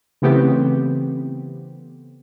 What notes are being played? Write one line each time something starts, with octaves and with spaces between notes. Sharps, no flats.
C#3 E3 A3 B3 C4 G4